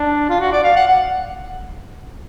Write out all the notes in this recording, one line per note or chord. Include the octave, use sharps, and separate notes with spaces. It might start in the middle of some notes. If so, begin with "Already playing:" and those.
Already playing: D4
F4
F#4
D5
F5
F#5
F#5